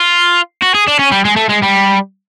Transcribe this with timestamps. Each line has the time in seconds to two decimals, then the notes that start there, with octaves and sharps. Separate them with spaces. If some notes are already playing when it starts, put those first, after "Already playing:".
Already playing: F4
0.62 F#4
0.74 G#4
0.88 D4
0.99 C#4
1.12 G3
1.25 G#3
1.36 A3
1.49 G#3
1.62 G3